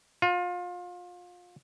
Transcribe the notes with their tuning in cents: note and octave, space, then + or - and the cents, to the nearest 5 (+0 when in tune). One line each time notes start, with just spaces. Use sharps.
F4 +30